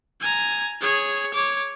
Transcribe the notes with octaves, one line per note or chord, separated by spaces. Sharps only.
G#5 A#5
G#4 C#5
C#5 D6